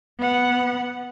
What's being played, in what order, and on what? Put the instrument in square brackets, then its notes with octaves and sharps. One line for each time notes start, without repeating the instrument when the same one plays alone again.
[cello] B3 F#5